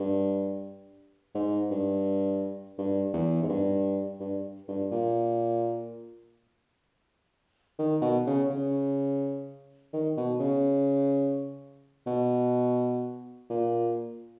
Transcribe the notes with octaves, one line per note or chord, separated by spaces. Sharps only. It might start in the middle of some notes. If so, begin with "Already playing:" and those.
Already playing: G2
G#2
G2
G2
E2
G#2
G2
G2
G2
A#2
D#3
B2
C#3
C#3
D#3
B2
C#3
B2
A#2